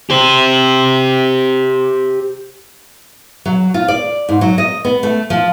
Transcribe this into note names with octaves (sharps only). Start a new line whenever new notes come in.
G4 C5
F#3
F4
D5
G#2
F#3
D#5
B3
A3
F3